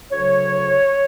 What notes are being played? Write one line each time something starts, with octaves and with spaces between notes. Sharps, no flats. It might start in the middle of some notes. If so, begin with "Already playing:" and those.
D2 C#3 F#3 C#5